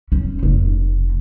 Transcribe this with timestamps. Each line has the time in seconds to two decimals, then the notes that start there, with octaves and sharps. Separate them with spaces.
0.12 C#4
0.43 F1